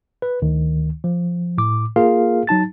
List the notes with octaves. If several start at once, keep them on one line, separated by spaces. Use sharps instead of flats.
B4
D2 D#3
F3
A2 D6
A#3 F4 G#4 A#4 F5
F#3 D#4 A5 A6